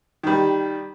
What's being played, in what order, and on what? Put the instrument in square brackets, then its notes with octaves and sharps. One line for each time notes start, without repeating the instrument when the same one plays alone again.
[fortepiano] D#3 G3